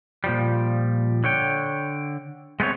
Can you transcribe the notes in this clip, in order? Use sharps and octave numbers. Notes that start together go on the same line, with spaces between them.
A#2 F3 G3
D3 C#5 G5
G#3 A3 B3 C4 C#5